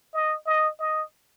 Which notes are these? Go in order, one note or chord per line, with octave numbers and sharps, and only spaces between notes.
D#5
D#5
D#5